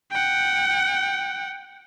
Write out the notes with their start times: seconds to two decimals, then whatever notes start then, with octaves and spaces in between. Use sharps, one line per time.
0.11 F#5 G5